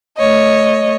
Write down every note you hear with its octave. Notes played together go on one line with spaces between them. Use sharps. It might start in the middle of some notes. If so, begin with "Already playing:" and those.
A3 C#5 D#5